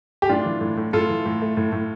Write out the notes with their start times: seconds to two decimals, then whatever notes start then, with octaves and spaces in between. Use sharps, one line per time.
0.22 G4
0.29 A2 D4 F4
0.46 E3
0.61 A2
0.77 A2
0.93 A2 F4 A4
1.10 E3
1.26 A2
1.42 A3
1.57 A2
1.72 A2